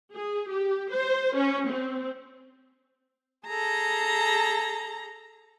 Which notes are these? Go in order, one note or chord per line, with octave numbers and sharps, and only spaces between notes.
G#4
G4
C5
C#4
C4
G#4 A4 A#5